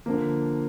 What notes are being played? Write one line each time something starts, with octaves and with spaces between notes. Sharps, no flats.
D3 F3 A#3